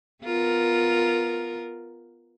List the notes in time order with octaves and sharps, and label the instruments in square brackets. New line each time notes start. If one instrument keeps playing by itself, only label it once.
[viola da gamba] B3 F4 A#4